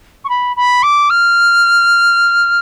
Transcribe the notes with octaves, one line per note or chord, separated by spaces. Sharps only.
C#6
B5
B5
D6
F6